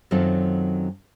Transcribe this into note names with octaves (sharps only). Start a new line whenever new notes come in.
F#2 D#3 F#3 C4 F4 A4